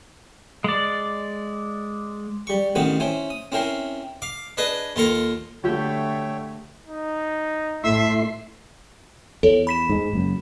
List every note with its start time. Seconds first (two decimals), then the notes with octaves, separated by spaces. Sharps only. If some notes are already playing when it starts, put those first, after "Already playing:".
0.64 G#3 D5
2.47 G3 C#6
2.75 A1 D#3 B3 C4 F#4
3.00 C#4 E4 C5
3.30 D#6
3.52 C4 C#4 E4 A#4 G5 C6
4.22 F5 D6
4.57 D4 G#4 B4 D#5
4.96 D#2 F4 A4 A#4
5.64 D3 A3 F#4 G4 C#5 E5 G5
6.87 D#4
7.84 A2 A3 E4 E5 C6
9.43 E2 A4 C#5
9.67 B5 B6 E7
9.89 G#2 G#3
10.13 F#1 F#2